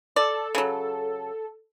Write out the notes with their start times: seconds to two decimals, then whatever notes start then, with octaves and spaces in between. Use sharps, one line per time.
0.16 A4 D5
0.55 C#3 F#3